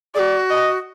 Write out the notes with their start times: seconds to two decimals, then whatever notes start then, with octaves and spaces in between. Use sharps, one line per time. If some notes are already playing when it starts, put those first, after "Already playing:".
0.15 G#4 D5
0.19 F#4
0.50 D#5